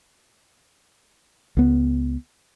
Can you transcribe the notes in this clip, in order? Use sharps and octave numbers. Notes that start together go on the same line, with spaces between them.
C#2 B3